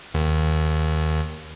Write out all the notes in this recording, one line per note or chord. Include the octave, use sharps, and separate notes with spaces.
D#2